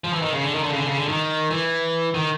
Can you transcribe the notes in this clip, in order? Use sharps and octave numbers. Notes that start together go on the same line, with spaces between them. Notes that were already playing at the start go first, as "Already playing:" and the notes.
F3
E3
D#3
C#3
D3
D#3
D3
C#3
D3
C#3
D3
D#3
E3
D#3